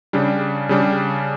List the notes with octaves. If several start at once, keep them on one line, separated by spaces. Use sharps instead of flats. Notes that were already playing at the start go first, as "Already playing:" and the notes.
C#3 G3 D4
C#3 G3 D4